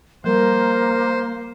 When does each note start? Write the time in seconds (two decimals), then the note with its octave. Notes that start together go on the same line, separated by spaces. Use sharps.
0.24 F3 G3 A#3 A#4 C5